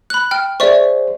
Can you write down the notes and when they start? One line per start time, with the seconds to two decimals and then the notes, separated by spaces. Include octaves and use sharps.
0.10 B5 F#6
0.31 G5 F6
0.60 G#4 C5 D5 E5 C#6